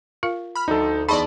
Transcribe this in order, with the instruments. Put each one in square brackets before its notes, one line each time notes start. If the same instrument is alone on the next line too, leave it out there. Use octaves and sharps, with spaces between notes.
[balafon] F4 A#4 F5
[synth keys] B5 F6
[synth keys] D2 F3 [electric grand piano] D#4 A4
[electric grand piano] E2 B5 [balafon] D#4 G#4 C#6 [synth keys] D5 D#5 A5